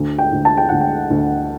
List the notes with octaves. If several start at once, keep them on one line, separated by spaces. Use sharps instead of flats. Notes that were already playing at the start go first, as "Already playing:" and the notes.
Already playing: D2
G5
D2
A5
G5
D2 F#5
G5
D2